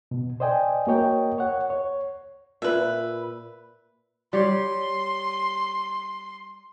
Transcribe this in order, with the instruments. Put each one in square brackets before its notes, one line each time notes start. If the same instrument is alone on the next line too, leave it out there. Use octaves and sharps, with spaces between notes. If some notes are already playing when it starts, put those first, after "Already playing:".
[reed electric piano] B2
C5 D5 D#5 G5 G#5
A#3 F#4 A#4 C#5 D#5 G5
C#5 F#5
C#5
[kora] A#2 [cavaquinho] B4 E5
[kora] G3 G4 C#5 [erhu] C6